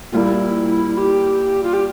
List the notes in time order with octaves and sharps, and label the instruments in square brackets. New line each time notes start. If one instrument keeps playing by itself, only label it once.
[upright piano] A#2 G3 A#3 [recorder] E4 F4
[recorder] G4
F4
G4